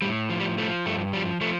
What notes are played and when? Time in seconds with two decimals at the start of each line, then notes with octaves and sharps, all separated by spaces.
0.02 A2 G3
0.30 F3
0.40 G3
0.58 F3 A3
0.86 G2 A3
1.13 F3 G3
1.41 F3 A3